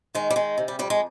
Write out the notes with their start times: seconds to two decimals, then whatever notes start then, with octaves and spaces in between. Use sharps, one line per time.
0.15 D#3 G#3
0.30 G3
0.36 D#3 G#3
0.58 C3
0.68 G3
0.79 F2 G3
0.90 G#3